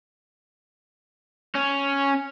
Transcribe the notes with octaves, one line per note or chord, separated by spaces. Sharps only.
C#4